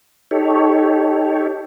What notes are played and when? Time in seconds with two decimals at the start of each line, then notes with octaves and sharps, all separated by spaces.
0.31 D#4 G4 A4 C#5